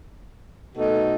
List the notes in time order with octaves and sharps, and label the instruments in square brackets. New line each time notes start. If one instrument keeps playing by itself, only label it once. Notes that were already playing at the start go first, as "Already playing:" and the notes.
[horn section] B2 A3 D#4 F#4 A4